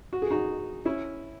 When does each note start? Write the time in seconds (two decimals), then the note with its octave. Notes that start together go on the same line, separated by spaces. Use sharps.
0.13 F#4
0.22 G#4
0.31 D#4 F#4
0.85 C#4 E4